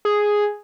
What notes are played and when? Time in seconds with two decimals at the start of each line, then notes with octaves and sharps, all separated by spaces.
0.05 G#4